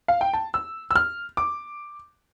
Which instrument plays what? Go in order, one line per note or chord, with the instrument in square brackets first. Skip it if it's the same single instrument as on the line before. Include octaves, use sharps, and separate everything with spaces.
[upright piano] F5
G5
A5
E6
E6
F6
D6